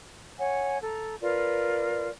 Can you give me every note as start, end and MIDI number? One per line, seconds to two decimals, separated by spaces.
0.38 0.77 73
0.38 0.77 78
0.38 0.77 80
0.83 1.15 69
0.83 1.15 82
1.21 2.09 65
1.21 2.09 70
1.21 2.09 71
1.21 2.09 74